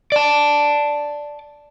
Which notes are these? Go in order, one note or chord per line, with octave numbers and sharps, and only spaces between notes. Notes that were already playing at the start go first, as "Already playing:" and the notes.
D5 A5